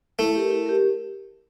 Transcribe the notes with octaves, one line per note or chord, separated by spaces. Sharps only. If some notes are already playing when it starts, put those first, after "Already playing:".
A3 E4
G4 A#4
E4
G4 A#4